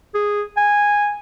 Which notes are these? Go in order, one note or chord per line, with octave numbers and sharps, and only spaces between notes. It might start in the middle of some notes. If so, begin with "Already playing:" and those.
G#4
G#5